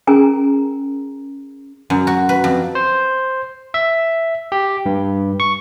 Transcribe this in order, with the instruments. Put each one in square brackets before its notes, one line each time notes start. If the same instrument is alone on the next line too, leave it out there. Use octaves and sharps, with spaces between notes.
[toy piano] C#4 G#4 A#4 G#5 A#5
[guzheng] F#2
F#4
B4
F2
[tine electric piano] C5
E5
G4
G2
C#6